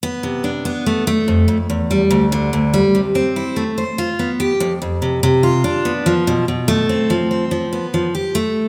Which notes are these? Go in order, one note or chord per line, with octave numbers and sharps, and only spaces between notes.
B3
C3
D4
B3
A3
A3
F2
F2
E2
G3
D2
D3
D2
G3
C3
C4
E4
A3
C5
F4
B3
G4
F2
F2
C3
C3
F4
D4
B3
F3
B2
B2
A3
C4
F3
C4
F3
B3
F3
G4
A3